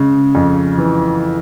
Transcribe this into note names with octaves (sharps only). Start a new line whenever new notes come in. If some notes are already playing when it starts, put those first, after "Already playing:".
Already playing: C#3 G#3
F2
E3